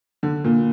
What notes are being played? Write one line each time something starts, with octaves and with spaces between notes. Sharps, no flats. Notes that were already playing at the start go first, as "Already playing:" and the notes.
D3
A#2